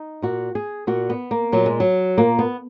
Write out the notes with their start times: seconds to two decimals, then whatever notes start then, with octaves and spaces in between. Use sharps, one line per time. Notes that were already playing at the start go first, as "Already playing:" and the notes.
Already playing: D#4
0.22 A#2 F#4
0.55 G#4
0.87 A#2 F#4
1.10 B3
1.31 A#3
1.52 A#2 F#3
1.66 G#3
1.80 F#3
2.18 A#2 A#3
2.39 B3